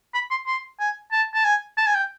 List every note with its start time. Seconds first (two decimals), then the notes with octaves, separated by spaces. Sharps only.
0.14 B5
0.31 C6
0.47 C6
0.80 G#5
1.12 A5
1.34 A5
1.45 G#5
1.77 A5
1.86 G#5
1.95 G5